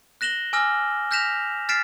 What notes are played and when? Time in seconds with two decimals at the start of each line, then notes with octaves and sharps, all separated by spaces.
0.21 F#6 A#6 E7 F#7 G7
0.53 G#5 D6 E6 F6 A#6
1.11 F6 G6 A#6 B6 E7 F7
1.69 F6 A6 B6 C7 D7 E7